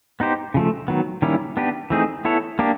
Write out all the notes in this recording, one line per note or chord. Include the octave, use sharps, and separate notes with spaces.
B3 D#4 G4 C5
C#3 F3 A3
D#3 F#3 B3
D#3 G3 A#3 C#4 E4
B3 D4 G4 B4
E3 A3 C4 D#4 G#4
B3 E4 A4 C#5
A#3 D4 G4